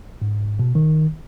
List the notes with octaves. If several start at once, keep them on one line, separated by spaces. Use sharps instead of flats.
G#2
B2
D#3